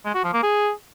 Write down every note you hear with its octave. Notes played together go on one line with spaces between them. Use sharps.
G#3
F#4
F3
A#3
G#4